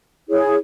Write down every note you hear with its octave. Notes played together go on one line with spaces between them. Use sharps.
E4 G#4 C#5